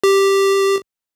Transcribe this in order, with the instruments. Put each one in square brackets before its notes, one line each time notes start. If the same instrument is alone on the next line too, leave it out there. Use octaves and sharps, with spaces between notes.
[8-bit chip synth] G4